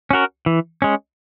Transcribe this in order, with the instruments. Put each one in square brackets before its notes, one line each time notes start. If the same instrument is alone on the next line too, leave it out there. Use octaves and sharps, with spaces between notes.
[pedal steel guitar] C#4 F#4 A#4
E3
G#3 C#4